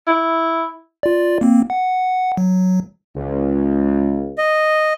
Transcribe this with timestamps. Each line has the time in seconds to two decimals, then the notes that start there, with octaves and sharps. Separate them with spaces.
0.07 E4
1.03 F4 D5
1.41 A#3 C4
1.70 F#5
2.37 F#3
3.16 C#2
4.38 D#5